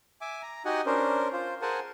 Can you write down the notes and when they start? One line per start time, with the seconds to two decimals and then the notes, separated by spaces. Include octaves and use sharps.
0.21 E5 G#5 D6
0.42 A#5
0.65 D#4 F#4 G4 D#5 F#5 G#5
0.86 C#4 D4 A#4 C5
1.33 F4 C5
1.62 G#4 A#4 C5 F#5 G#5 A5